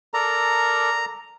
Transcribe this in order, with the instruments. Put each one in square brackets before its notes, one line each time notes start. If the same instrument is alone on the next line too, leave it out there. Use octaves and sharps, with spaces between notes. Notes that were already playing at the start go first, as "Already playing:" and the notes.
[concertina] A4 A#4 D5 [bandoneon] A#5